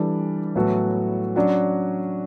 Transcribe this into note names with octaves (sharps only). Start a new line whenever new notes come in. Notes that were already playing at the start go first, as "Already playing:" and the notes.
Already playing: E3 G3 D4 A4 D5
A2 F#3 B3 F#4 A4
F#3 C#4 D4 F#4